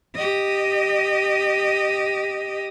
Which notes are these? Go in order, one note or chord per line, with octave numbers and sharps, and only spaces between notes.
G4 D#5